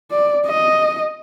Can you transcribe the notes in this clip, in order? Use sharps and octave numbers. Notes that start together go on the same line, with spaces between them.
D5
D#5